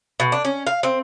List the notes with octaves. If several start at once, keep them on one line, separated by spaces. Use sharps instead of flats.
B2
D4
C#4
F5
C4